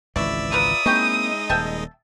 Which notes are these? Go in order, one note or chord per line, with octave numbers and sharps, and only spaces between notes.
G#1 C#2 B2 E3 E4 D5 E5 E6
F4 A#4 B4 D#6
G#3 A#3 C4 C#4 D#4 E4 D#5 G5
D#1 E5 G5 A5